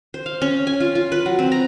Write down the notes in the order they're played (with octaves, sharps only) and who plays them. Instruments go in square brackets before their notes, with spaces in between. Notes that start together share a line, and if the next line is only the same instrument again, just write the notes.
[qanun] C5
F5
C#4
G#5
F4
F4
B4
F#3
C4
A#5